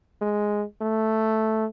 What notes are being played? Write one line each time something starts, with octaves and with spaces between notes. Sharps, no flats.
G#3
A3